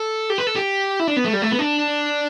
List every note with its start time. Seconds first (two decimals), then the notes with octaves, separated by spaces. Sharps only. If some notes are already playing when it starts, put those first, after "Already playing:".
Already playing: A4
0.30 G4
0.38 B4
0.47 A4
0.55 G4
1.00 E4
1.07 D4
1.16 B3
1.25 A3
1.33 G3
1.42 A3
1.51 B3
1.59 D4